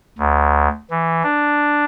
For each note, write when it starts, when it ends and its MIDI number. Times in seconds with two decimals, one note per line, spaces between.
0.18 0.68 38
0.91 1.23 52
1.23 1.85 62